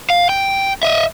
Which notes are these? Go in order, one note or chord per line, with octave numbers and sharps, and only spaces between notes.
F5
G5
D#5 E5